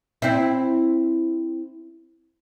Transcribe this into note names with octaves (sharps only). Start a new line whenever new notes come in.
C4 E4